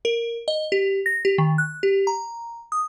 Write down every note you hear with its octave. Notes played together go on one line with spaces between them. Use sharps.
A#4
D#5
G4
A#6
G4
D#3
F#6
G4
A#5
D#6